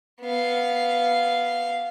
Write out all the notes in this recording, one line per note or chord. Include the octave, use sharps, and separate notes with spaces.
B3 F5